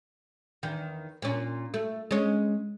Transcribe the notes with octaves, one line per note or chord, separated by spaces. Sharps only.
E2 D#3
A#2 C#4
A3
G#3 C#4